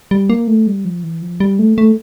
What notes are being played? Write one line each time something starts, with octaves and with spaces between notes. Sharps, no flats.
G3
A#3
A3
G3
F3
E3
F3
G3
A3
A3